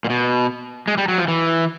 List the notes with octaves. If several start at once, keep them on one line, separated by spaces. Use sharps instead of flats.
A#2
B2
G#3
G3
F#3
F3
E3